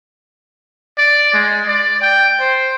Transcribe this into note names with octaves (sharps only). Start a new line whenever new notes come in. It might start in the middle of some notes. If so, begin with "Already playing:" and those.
D5
G#3
D5
G5
C5